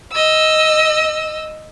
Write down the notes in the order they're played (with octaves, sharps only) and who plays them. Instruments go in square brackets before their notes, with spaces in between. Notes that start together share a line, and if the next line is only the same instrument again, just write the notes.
[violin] D#5 E6